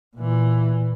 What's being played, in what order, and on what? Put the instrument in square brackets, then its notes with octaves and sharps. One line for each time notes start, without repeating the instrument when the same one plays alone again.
[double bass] A#2 E3